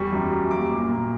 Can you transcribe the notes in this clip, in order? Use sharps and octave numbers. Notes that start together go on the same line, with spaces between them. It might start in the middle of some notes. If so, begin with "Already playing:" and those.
Already playing: E2 G3 C#6
F#2
F#2
A#3 D6
A#2
A#2